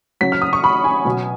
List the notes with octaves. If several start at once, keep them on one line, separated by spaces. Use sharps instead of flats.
C#3 F#3 B6
F6
D#6
C#6
B5
G#5
B2 F#3